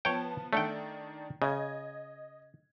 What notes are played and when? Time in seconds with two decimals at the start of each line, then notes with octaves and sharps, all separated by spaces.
0.05 F3 B3 C#5 G5 A5
0.53 D#3 A3 D4 F#5 G5
1.42 C#3 D#5 G#6